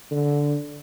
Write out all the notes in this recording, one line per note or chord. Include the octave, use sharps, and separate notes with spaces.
D3